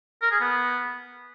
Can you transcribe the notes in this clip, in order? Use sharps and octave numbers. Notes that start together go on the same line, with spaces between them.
A#4
G#4
B3